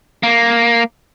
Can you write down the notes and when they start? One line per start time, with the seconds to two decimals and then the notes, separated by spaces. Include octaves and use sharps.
0.23 A#3